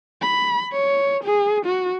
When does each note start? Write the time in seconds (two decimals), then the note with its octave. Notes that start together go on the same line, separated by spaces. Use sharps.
0.22 B5
0.72 C#5
1.24 G#4
1.65 F#4